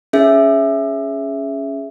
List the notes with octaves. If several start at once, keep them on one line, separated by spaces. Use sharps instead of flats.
C#4 G#4 E5